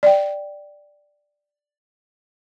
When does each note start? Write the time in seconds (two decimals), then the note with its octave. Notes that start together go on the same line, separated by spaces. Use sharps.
0.03 D5 G5